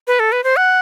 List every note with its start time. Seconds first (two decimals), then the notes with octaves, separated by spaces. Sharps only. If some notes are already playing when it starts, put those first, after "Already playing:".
0.07 B4
0.20 A4
0.32 B4
0.44 C5
0.57 F#5